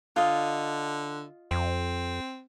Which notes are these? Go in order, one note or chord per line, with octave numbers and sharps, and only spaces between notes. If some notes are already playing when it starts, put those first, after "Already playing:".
D3 F4 D#5
F2 C4